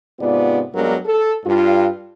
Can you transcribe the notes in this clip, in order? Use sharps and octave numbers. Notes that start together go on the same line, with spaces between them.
G#2 C3 B3 F4 D5
G2 F#3 G#3 B3 D4 A#4
A4
G2 F4